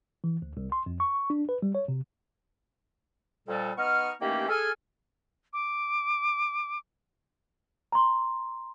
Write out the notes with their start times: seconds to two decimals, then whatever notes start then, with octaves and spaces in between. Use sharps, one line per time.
0.24 E3
0.42 D2
0.57 C2
0.72 C6
0.86 F2
1.00 C#6
1.30 D4
1.49 B4
1.62 G3
1.75 C#5
1.88 C3
3.48 F2 A#2 G3 A4
3.78 B3 D#4 D#5 C#6 F6
4.22 D#3 E3 A3 A#3 C#4 G4
4.49 G#4 A4 G#5 F6
5.53 D6
7.92 A#5 C6